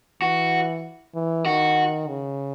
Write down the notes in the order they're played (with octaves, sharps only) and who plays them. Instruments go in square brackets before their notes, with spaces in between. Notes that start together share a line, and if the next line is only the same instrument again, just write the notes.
[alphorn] E3 [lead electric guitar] F#4
[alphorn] E3
[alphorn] D#3 [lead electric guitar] F#4
[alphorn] C#3